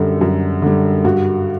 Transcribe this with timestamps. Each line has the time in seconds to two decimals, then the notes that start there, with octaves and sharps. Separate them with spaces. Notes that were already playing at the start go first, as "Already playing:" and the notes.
Already playing: F#2 D3 G3 A4
0.21 F#2
0.62 D3 G3
1.05 G2 F#4